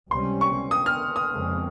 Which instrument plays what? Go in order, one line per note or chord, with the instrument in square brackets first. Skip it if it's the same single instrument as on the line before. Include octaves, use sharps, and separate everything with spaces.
[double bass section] C#2 C3 G3 C#4 [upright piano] C6
[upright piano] C#6
D#6
F6
D#6
[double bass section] F2 C#3 G#3 C4